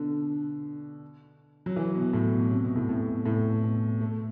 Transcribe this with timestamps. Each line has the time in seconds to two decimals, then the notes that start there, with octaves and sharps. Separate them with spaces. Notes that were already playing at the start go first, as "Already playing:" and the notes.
Already playing: B2 D3
1.66 F#3
1.76 E3
1.95 B2
2.13 A2
2.32 B2
2.51 C3
2.65 B2
2.76 A2
2.89 A2
3.02 B2
3.26 A2
3.63 B2
4.01 A3